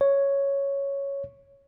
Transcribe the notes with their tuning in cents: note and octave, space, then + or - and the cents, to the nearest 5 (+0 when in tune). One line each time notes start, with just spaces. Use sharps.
C#5 +0